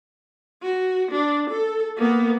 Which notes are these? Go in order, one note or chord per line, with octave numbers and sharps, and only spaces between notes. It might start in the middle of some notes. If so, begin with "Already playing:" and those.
F#4
D4
A4
A#3 B3